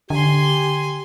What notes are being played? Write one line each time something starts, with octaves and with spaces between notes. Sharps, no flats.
D3 G4 G#5 C6